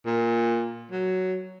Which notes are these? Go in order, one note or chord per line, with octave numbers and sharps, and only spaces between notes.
A#2
F#3